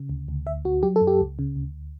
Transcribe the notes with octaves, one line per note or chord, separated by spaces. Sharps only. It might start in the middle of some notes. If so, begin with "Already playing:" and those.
Already playing: C#3
D2
D2
D2 E5
D2 F#4
F#3 G4
A4
F#2
G4
C#2
C#3
D2